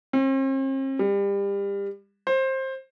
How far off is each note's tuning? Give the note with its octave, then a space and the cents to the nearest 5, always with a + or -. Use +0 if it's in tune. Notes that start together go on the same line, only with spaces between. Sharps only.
C4 +45
G3 +30
C5 +20